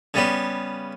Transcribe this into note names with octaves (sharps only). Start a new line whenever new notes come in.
C#3 G3 B3